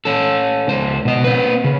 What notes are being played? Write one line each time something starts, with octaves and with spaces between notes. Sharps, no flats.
C#4 A4
C#2 C5
B2 D#5
C4 B4
C#3